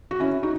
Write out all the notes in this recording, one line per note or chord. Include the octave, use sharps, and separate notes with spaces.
F#4
C#4 E4
D#4 F#4